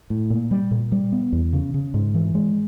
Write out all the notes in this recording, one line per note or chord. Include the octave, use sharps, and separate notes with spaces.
A2
A#2
G3
A#2
G3
B3
E2
C#3
C#3
G#2
E3
G#3